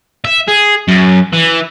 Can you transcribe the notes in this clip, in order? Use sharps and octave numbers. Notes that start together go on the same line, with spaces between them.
E5
G#4
F#2
E3